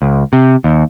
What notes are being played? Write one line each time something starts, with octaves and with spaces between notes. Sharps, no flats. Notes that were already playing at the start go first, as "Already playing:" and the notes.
C#2
C3
D#2